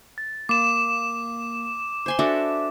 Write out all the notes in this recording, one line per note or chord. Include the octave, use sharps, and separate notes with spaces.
A6
A#3 D6 E7
C5 G#5 C6
D4 F#4 A4 E5 D6